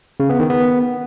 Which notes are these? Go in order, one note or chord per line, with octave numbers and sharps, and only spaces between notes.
C#3
B3
D#3
B3